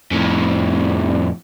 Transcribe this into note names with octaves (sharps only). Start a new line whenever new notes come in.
F2 A2